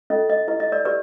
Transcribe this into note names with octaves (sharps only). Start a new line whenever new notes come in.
C#4 F4 A4 D#5
D#5
E4 G4 B4 D#5
D#5
D5
G4 B4 D5